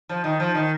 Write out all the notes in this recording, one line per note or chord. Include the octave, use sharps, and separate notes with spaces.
F3
D#3
F3
D#3